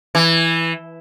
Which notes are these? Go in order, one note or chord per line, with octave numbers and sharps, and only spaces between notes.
E3